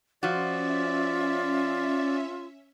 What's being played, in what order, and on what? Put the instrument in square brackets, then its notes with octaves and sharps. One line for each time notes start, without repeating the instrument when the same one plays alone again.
[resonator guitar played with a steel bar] F3 F#4 [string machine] C#4 E5 [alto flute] F4 [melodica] D5